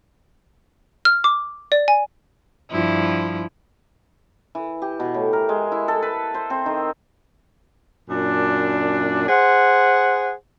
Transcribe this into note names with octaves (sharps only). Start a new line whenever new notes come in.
F6
D6
D5
G#5
G2 F3 E4
E3
G4
B2
A2
A#4
G#3
E4
A4
B4
C5
C4
D#3
F#2 A#2 D4
G#4 C5 F#5